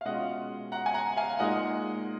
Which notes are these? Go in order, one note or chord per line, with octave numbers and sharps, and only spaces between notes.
F5
B2 G#3 C#4 F4 D#5 F#5
F#5 A#5
G#5
F#5 A#5
F5 G#5
A#2 G#3 D#4 D#5 F#5